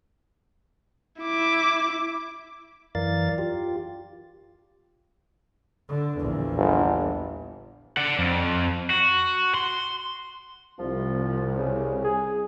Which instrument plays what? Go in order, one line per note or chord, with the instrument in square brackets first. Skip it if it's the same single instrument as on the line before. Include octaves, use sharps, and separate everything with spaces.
[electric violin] E4 D6
[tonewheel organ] F#2 E3 A#4 D5 F5 A6
F4 G4
[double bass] D3
A#1 E2
[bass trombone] G1
[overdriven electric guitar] D5 F#5
F2
F#4
C6
[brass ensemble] C2 [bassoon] F3
[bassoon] C#3
G#4